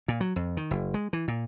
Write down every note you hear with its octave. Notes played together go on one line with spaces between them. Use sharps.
A#2
F#3
F2
D#3
F#1
G#3
E3
A#2